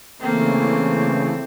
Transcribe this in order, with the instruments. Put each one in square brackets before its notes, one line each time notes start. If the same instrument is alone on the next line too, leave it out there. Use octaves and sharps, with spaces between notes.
[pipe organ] C#3 E3 A3 [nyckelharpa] A#3 A4 [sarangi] C4